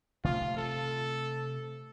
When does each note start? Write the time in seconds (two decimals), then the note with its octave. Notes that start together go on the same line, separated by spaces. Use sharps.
0.24 C3 A3 C4 F4
0.57 A4